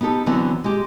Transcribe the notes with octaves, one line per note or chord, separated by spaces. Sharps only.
B3 D#4 G4 A4
D3 E3 F#3 B3 C4
G#3 G4